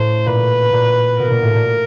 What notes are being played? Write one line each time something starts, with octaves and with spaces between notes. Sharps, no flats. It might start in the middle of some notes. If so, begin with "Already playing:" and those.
Already playing: A2 C5
A#2 B4
A#2
B2 A#4
A#2
A2
A#2